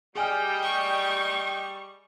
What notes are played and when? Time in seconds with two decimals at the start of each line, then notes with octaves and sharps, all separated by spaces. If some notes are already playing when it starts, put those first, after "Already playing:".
0.15 G3 G#4 D#5 G5 G#5 F6
0.63 C#6